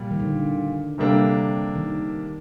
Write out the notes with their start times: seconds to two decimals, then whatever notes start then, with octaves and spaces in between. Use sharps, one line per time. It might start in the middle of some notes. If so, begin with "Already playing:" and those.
Already playing: A#2 G3
0.11 D#3
0.20 D3
0.98 C3 G3 A#3 D4 A4
1.76 D#3